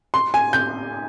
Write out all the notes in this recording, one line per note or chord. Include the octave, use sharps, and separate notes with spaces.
C6
G#5
G6